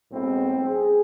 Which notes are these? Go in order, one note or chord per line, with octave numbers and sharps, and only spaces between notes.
B1 A2 G#3 B3 C4
G#4